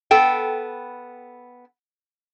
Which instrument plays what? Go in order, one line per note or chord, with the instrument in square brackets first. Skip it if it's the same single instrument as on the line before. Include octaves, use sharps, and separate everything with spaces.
[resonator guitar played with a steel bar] B3 A4 G5